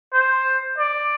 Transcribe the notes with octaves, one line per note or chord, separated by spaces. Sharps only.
C5
D5